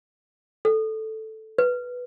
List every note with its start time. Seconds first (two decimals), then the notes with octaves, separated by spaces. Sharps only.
0.65 A4
1.58 B4